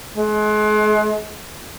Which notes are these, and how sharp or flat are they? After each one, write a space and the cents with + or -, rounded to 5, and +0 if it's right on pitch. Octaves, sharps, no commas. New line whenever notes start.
G#3 +35